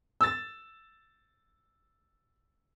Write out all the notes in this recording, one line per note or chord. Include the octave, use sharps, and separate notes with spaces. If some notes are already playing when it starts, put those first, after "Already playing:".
E6 A6